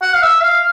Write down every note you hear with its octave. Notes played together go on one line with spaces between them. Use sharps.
F#5
F5
E5
F5